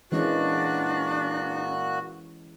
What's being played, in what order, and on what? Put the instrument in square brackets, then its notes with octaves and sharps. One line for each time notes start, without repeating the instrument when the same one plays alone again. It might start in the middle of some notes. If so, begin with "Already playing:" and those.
[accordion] A#2 F#4 F#6 [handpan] E3 G#3 C#4 [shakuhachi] D4